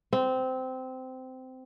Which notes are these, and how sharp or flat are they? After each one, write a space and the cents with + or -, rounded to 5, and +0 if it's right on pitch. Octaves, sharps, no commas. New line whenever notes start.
C4 -15